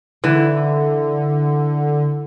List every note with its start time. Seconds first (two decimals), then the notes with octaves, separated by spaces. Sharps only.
0.24 D3 E3